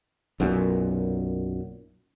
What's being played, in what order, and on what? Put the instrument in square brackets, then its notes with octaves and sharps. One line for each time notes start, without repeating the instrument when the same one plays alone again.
[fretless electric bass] B1 F#2 A#2